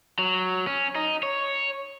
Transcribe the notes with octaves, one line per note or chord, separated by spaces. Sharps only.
F#3
C#4
D#4
C#5